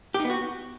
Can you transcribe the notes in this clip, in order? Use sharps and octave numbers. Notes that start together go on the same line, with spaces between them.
G4
D#4
B3
F#4